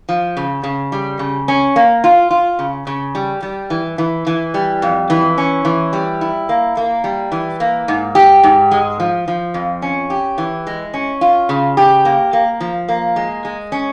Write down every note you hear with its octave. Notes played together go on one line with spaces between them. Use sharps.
F3
C#3
C#3
G3
C#3
C#4
A#3
F4
F4
C#3
C#3
G3
G3
E3
E3
E3
G3
F2
E3
C#4
E3
G3
E4
A#3
A#3
G3
E3
A#3
G#2
G4
G#2
G#3
F3
F3
F2
C#4
G4
E3
G#3
C#4
F4
C#3
G4
A#3
A#3
F3
A#3
G#3
G#3
C#4